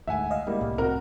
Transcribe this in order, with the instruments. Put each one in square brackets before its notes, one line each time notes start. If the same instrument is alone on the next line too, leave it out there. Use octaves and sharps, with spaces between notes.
[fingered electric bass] D2 G#2 [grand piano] E5 F#5 G#5
[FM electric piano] D#5 F5
[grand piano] G3 A#3 E4 [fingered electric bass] G#3
[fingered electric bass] C2 A2
[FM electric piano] C4 [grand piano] F#4 A#4